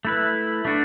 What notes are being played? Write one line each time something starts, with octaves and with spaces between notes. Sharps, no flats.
A3 E4 B4
A3 D4 F#4